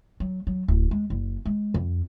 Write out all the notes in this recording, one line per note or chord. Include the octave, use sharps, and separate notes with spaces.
F#3
F#3
D1
G#3
F#1
G#3
F2